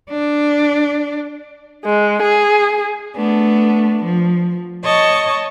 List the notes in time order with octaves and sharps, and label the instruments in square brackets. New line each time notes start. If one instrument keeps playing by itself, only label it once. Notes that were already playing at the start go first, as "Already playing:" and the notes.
[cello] D4
[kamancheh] G#3
G#4
[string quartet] A3 B3 D4
F3
C#5 D#5 A5 C#6